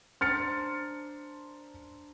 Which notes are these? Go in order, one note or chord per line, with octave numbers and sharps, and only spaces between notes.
D4 A#4 C5 F6 A6 C#7